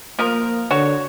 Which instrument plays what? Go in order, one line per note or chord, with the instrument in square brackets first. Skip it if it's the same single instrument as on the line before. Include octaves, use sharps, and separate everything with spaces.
[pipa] F3 A#4 [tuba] A#3
[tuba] D3 [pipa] F#4 C#5